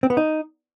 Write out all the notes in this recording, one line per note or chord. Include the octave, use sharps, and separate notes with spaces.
C4
B3
D#4